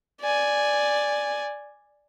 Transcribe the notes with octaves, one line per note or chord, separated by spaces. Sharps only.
D5 G#5